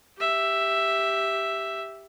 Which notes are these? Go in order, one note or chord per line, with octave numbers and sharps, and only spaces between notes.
G4 E5